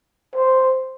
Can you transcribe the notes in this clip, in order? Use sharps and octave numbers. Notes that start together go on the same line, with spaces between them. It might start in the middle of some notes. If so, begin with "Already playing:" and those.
C5